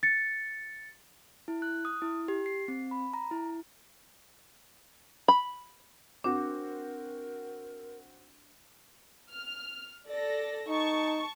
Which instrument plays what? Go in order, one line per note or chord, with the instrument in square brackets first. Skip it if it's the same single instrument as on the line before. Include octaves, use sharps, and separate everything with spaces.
[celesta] A6 C#7
[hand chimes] E4
F#6
D#6
E4
G4
C7
C4
B5
A#5
E4
[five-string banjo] B5
[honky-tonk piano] C4 F#4 [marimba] D4 [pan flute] A#4
[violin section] F6
A4 D5 A#6
[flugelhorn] D#4 [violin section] A5 C#6